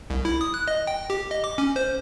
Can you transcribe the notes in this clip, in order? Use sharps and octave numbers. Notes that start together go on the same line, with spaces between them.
C2
E4
D#6
F#6
D#5
G5
G4
D#5
D6
C#4
C5